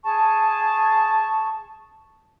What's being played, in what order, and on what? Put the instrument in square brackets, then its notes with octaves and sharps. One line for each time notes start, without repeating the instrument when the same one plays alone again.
[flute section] G#4 A5 C#6